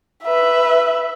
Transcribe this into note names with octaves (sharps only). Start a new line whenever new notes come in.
B4 E5